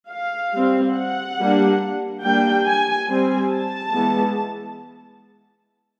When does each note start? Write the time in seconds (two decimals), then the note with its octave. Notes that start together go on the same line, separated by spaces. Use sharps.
0.11 F5
0.53 G3 C4
0.95 F#5
1.38 G3 A#3 D4
2.23 G3 A#3 D4 G5
2.65 G#5
3.08 G3 C4 G#5
3.50 A5
3.93 E3 G#3 B3